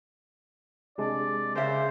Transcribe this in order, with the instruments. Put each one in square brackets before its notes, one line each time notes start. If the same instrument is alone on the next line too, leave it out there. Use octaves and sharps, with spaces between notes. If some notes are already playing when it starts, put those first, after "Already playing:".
[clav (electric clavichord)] C3 G#3 D4 [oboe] D5
[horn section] C#3 [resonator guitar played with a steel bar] A#4 E5 [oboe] C5